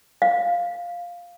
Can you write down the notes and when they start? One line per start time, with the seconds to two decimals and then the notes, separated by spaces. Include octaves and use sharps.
0.22 F5